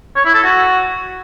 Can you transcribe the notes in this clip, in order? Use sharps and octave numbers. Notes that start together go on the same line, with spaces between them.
C#5
E4
A4
F#4